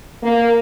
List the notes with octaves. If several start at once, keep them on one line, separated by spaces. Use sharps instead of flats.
A#3